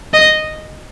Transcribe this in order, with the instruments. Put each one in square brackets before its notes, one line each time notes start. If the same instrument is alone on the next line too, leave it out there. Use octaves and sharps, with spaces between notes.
[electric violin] D#5